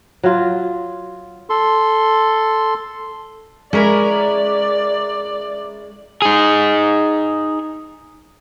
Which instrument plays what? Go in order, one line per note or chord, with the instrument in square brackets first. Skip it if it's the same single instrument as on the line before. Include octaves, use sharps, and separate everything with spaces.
[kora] F#3 F4
[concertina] A4 C6
[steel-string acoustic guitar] G#3 [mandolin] C#4 E4 A#4 [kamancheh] D5
[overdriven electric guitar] D#4 G#4